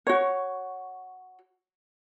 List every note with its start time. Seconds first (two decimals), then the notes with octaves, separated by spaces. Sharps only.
0.07 F#4 C#5